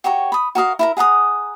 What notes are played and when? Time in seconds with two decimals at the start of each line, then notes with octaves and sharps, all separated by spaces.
0.04 F#4 G4 C#5 A#5
0.32 B5 D#6
0.55 F#4 A#4 D#5 F5
0.79 E4 A#4 A#5
0.97 G#4 F#5 A#5 D#6